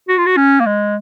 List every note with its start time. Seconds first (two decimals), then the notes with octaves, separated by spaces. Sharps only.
0.08 F#4
0.17 F4
0.26 F#4
0.37 C#4
0.60 A#3
0.66 G#3